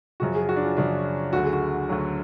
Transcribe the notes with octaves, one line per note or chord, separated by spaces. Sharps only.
F#2 C#3 F3 F#4
G#4
F#4
D4
F4
F#2 C#3 F3 D4
D2 D3 F#3 F#4
G#4
F#4
D2 D3 F#3